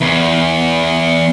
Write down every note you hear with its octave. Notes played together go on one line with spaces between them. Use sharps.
E2 E3